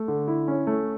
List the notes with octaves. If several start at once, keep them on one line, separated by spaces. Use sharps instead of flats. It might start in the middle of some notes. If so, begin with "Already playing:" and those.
Already playing: A3
D3
E4
C#4
A3